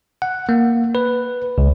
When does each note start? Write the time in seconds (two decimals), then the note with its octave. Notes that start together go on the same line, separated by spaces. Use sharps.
0.22 F#5
0.49 A#3
0.95 B4
1.58 C#2